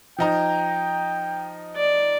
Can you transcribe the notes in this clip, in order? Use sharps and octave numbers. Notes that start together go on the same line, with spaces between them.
F3 D#4 G5 A#5
D5